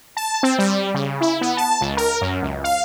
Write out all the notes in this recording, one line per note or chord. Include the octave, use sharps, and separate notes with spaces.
A5
C4
G3
C#3
E4
B3
A5
C#2
A#4
F#2
C#2
F5